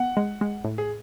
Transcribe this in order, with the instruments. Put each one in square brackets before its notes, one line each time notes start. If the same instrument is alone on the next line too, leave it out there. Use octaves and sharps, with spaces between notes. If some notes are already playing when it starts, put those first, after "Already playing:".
Already playing: [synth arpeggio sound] B3 [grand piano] F#5
[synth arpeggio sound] G#3
G#3
A2
[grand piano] G#4